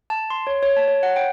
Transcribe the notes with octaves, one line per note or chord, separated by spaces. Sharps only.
A5
C6
C#5
C#5
A5
C#5
F#5
G5